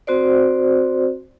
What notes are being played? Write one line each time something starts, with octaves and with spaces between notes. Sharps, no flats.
C4 F#4 C5 D5